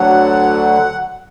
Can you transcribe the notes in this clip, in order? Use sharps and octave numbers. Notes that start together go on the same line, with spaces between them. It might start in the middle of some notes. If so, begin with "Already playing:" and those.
Already playing: D2 D3 F#3 F#5